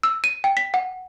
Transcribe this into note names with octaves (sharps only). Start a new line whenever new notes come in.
E6
D#7
G5
B6
F#5